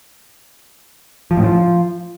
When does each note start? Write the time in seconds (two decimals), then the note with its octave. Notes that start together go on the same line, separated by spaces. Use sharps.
1.31 F3
1.37 A2
1.44 F3